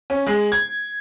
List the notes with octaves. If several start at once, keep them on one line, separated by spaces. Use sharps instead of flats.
C#4
G#3
G#6